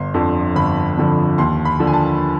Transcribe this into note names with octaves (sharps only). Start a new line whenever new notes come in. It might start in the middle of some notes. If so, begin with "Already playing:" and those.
Already playing: G1 C6
F2 D3 F3
G1 B5
F2 D3 F3
D#2 C6
B5
D3 F3
G#5
A5